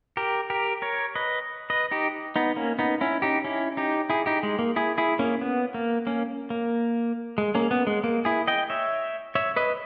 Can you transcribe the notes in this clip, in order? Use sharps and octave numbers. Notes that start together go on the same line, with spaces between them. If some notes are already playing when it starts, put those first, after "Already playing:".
G4 A#4
G4 A#4
A#4 C#5
B4 D#5
B4 D#5
D#4 G4
B3 D#4
A#3 C#4
B3 D#4
C#4 E4
D#4 G4
C#4 E4
D#4 G4
E4 G#4
D#4 G4
G#3
A#3
E4 G#4
E4 G#4
A#3 C#4
B3
A#3
A#3 C#4
A#3
G#3
A#3 C#4
B3
G#3
A#3
E4 G#4
D#5 G5
C#5 E5
C#5 E5
B4 D#5